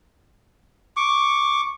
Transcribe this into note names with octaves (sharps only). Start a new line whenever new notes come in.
C#6 D6